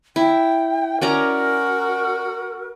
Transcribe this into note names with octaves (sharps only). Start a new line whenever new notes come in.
E4 G5
C#4 F#4 A#4 D5 A#5